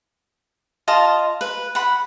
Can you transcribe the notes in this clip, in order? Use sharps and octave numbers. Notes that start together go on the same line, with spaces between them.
F4 D#5 F5 A5
B4
F#5 B5